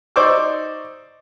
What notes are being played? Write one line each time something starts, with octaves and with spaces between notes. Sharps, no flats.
D#4 C5 D5 C#6 D6 E6